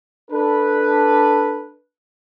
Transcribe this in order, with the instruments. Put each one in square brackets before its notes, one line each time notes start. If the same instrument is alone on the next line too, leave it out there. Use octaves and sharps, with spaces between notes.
[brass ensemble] D4 A4 B4